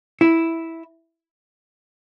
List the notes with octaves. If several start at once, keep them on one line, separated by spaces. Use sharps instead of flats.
E4